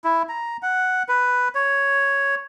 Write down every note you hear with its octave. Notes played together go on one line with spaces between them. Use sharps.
E4
A#5
F#5
B4
C#5